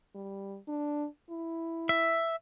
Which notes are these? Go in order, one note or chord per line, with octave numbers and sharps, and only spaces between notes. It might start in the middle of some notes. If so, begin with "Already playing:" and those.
G3
D4
E4
E5